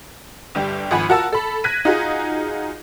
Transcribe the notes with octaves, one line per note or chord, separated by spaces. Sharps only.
G1 G3 G5
G#1 F3 F#5 G#5 B5
F4 F#4 A#4 F#5 A5 E6
A4 B5
F#6 G#6 A#6 B6 D#7
D#4 F4 F#4 G#4